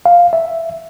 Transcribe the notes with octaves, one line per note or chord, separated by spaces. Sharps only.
F5
E5